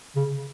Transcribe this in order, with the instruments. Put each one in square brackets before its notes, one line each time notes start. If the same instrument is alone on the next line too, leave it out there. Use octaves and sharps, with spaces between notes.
[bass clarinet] C#3